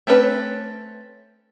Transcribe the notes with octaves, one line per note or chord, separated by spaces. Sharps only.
A3 C4 C#4 B4